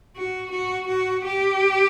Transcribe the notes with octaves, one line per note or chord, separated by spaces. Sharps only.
F#4
F#4
F#4
G4